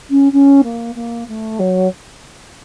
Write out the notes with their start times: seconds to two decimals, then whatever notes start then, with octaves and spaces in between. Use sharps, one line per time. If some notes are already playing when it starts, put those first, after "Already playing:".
0.10 C#4
0.32 C#4
0.63 A#3
0.95 A#3
1.28 A3
1.59 F#3